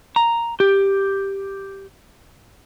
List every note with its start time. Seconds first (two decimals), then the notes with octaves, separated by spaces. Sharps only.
0.16 A#5
0.60 G4